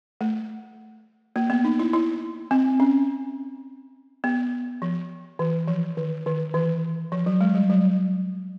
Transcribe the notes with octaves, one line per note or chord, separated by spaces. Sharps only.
A3
A#3
B3
D#4
E4
E4
C4
C#4
B3
F3
E3
F3
D#3
D#3
E3
F3
F#3
G#3
G3
F#3